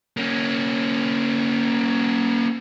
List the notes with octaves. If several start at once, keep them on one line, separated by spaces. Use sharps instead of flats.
A#3 C#4